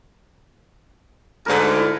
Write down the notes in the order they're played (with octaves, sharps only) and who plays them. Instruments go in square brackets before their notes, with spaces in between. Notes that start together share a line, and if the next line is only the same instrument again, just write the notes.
[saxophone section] D2 G#2 D3 [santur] A#4 B4
[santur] E4